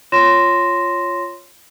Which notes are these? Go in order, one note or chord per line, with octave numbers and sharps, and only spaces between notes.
F4 C#5 C6 A#6 E7